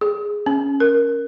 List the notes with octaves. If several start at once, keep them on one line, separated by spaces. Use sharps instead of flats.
G#4
C#4
A#4